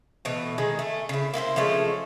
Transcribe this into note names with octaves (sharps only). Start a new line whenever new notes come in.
B2 E3 A3
D#3 G#3 D#4
A3
C#3 E4
A#3 E4 G#4 C5
F3 G#3 A3 C#4